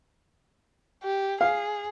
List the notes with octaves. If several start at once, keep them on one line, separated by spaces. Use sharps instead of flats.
G4
G#4 F5